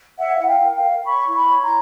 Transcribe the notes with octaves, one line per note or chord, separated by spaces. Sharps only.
C#5 E5 F#5
F5
E4 F#5
F5 G5
A#4
F5 G5
A#4
C#5 B5 C#6
E4
B5 C#6
C#5
A#5 C6